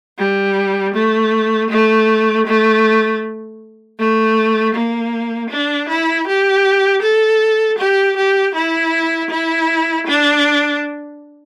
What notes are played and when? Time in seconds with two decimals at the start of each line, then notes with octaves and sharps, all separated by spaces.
0.18 G3
0.94 A3
1.70 A3
2.47 A3
3.99 A3
4.74 A#3
5.50 D4
5.89 E4
6.27 G4
7.02 A4
7.78 G4
8.17 G4
8.54 E4
9.31 E4
10.07 D4